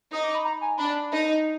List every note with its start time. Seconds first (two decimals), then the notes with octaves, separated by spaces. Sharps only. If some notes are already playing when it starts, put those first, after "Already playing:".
0.12 D#4 D#6
0.23 D6
0.35 B5
0.45 A#5
0.61 G#5
0.78 D4 B5
1.11 D#4